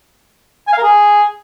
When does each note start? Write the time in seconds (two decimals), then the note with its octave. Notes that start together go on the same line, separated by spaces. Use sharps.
0.67 G#5
0.73 F5
0.78 A#4
0.83 G#4